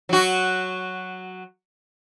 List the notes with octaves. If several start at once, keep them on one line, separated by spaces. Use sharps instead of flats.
F#3 F#4